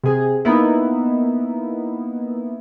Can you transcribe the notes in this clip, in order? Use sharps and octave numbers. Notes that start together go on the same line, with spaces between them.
C3 G#4
A#3 B3 D#4 E4